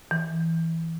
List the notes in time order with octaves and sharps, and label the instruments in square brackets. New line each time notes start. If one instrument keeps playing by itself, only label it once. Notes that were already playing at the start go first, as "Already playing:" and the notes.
[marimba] E3